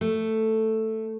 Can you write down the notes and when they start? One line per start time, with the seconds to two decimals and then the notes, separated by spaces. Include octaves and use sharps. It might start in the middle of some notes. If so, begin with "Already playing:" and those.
0.01 A3